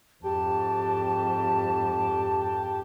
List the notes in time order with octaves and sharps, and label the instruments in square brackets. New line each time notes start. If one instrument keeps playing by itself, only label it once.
[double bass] F2 G#2 [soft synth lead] G4 [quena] A5